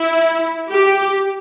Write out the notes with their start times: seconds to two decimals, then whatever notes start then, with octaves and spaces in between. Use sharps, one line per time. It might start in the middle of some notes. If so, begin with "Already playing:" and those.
Already playing: E4
0.70 G4